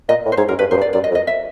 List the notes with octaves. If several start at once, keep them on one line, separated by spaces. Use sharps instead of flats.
A#2 D#5
A2
C5
G#2 C#5
F#2 A#4
G2 B4
F#2 C5
G2
D5
F#2 D5
D#5
F2
D#5
E5